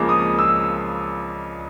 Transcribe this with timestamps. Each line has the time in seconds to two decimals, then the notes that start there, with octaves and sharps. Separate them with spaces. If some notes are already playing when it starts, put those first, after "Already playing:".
Already playing: C#2 C#3 F3 A#3 D6
0.09 D#6
0.39 E6